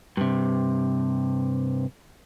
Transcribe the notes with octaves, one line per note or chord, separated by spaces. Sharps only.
G2 C3